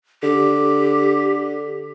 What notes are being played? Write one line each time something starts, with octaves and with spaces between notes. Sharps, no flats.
D3 G4